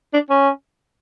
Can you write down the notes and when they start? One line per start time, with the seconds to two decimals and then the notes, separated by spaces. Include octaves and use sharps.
0.13 D4
0.30 C#4